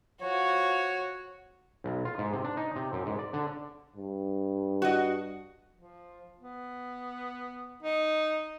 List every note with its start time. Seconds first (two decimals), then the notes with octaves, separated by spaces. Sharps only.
0.22 F3 F#4 C#5
1.84 B1
2.05 F4
2.18 G#2
2.33 C3
2.44 D4
2.57 D#4
2.76 C3
2.93 F#2
3.06 G#2
3.19 D5
3.33 D3
3.96 G2
4.82 F#4 D#5
5.74 F3
6.40 B3
7.83 D#4